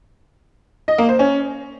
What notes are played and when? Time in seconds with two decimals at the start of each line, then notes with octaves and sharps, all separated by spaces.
0.88 D#5
0.98 A#3
1.09 C5
1.19 C#4